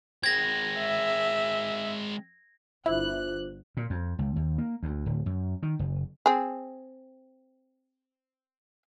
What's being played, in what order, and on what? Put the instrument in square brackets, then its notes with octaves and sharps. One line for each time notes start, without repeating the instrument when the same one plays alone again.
[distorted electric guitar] G#3 C4 [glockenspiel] G#6 A#6
[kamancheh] E5
[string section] G1 F#6 [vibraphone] D4 F4 C5 [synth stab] E4
[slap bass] A#2
F2
C#2
D#2
A#3
D2
D1
F#2
D#3
F#1
[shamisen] C4 G#4